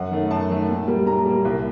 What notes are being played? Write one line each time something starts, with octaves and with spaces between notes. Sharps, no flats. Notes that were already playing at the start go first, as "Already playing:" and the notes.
Already playing: F#2 F#5
D#3 A3
F#2 A5
D#3 A3
A#2
G3 A#3
A#2 A#5
G3 A#3
C2